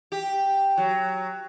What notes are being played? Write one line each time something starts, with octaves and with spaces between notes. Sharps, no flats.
G4
F#3